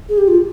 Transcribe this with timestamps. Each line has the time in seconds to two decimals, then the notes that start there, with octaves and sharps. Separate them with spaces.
0.09 G#4
0.18 G4
0.28 F4